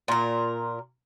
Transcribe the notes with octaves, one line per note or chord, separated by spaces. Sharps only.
A#2 A#4